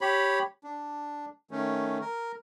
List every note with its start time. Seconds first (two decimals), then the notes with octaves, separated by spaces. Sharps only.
0.01 G4 C#5 B5
0.64 D4
1.51 D#3 A3 C#4
2.01 A#4